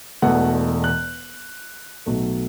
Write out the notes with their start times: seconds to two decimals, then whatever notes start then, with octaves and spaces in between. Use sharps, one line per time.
0.22 E1 E2 B2 A3 F#5
0.84 F#6
2.06 B1 B2 F#3 A3